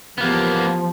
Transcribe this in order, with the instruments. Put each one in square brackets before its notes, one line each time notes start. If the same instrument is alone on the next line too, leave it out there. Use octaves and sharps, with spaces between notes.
[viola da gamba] E2 G4 [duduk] F3 [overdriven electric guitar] A#3 B3